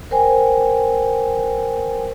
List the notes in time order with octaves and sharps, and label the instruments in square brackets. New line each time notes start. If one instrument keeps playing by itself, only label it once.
[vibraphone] A#4 C5 G5 G#5